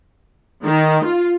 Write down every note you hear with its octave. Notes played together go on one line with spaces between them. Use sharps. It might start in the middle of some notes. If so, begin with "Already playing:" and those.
D#3
F4